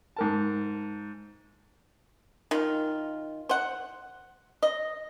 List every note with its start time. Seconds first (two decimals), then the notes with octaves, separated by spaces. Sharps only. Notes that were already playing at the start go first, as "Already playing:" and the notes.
0.16 G#2 A#4 A5
2.51 D#3 F4
3.49 C5 F#5
4.63 D#5